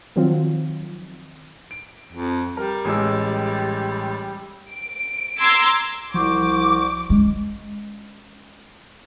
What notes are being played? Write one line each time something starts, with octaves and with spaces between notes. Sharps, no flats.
D#3 F3 F#3 C4 F4
D7
F2
G3 A#4
A1 G#3 E6
D7
A#5 C6 D6 E6 G#6
C2 F3 F#4 C5 D6
G#3 C#4